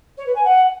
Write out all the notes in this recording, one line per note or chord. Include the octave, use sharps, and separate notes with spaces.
C#5
B4
G#5
F#5